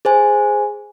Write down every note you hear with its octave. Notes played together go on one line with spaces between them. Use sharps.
G#4 C5 G#5